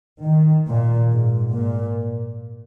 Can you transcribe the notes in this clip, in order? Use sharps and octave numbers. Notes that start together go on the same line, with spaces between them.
D#3
A#2
G#2
A#2